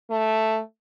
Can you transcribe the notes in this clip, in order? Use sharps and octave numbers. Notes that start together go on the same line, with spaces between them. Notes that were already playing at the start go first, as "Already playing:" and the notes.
A3